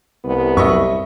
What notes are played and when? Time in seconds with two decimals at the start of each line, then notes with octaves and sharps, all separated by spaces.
0.24 C2 B3
0.57 F#2 A2 D#5 E5 C#6